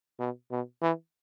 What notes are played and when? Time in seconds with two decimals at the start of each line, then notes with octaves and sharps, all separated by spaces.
0.20 B2
0.51 B2
0.82 E3